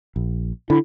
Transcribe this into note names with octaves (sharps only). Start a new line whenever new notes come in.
A#1
D3 E4